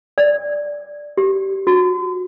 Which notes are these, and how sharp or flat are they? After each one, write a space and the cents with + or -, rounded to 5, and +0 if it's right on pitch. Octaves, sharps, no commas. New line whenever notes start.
D5 +0
G4 -20
F#4 -25